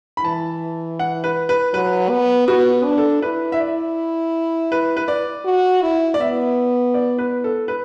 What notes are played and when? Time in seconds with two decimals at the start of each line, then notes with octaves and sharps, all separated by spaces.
0.17 B5
0.24 E3 A5
0.99 F#5
1.24 B4
1.49 B4
1.73 F#3 B4
2.10 B3
2.48 B3 F#4
2.85 D4
2.98 A4
3.22 E4 B4
3.52 E5
3.60 D5
4.72 B4
4.97 B4
5.08 D5
5.45 F#4
5.82 E4
6.14 D5
6.20 B3 E5
6.94 D5
7.18 B4
7.44 A4
7.68 B4